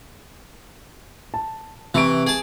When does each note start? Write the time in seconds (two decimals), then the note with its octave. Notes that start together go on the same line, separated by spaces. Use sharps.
1.34 A5
1.94 C3 E3 C#6 D7
2.27 G#4 A5